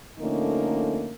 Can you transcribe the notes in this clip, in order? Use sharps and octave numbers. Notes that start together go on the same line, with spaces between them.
D3 F3 A3 A#3 C#4 D#4